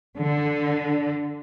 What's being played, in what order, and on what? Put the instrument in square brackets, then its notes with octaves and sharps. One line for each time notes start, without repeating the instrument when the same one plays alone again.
[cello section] D3